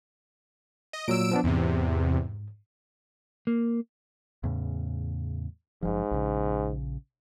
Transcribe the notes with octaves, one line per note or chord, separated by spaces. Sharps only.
D#5
A#2 F#3 E6 D7
F3 B3 D4
E2 G#2 C3
A#3
E2 A2 C#3
F#1 G#2 F3
A#1 C#3